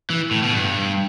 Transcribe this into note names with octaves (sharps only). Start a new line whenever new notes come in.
E3
A2
B2
G2